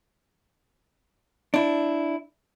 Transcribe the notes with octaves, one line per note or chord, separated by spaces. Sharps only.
D4 E4